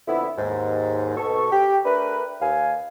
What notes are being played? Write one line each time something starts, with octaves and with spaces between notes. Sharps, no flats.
F2 D3 B3 E4
D#2 G#2
B2 A4 C#6
G4
A3 D4 A#4 B4
D#2 F5 G#5